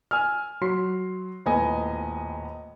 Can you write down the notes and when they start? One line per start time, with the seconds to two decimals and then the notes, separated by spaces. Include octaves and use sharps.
0.11 G#5 E6 F6
0.61 F#3 F#4 C6 C7
1.46 D#1 A2 B3 D#5 G#5